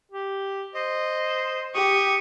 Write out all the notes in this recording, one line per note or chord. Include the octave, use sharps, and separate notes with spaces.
G4
C5 D#5
G4 C#6 D#6